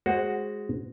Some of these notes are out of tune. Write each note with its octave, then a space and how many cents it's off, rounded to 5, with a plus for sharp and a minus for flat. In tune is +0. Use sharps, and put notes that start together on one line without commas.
G#3 +0 F#4 +0 C5 +25